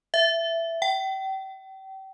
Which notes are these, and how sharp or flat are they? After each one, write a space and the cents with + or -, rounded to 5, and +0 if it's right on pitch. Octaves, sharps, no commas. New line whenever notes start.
E5 +10
G5 -35